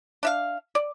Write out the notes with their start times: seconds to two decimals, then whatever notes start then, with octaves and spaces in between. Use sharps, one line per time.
0.23 D4 E5 F5
0.75 D5